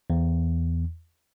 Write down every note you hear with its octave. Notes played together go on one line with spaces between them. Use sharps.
E2